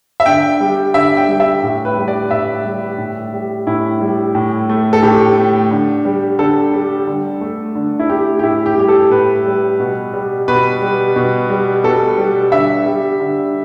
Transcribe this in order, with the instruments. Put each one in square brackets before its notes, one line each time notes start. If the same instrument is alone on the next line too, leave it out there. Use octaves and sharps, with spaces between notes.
[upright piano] E5
D3 G5
G3
D3 E5
G5
G3
E5
A2
B4
G3
D5
A2 E5
G3
A2
G3
A2 E4
G3
A2
A3
A4
A2 G4
A3
D3
G3
D3 A4
G3
D3
A3
D3
E4
A3 G4
G4
A2 E4
G4
G3 G4
A4
A2 B4
G3
B2
G3
B2 B4
G3
B2
G3
B2 A4
G3
D3 E5
G3
D3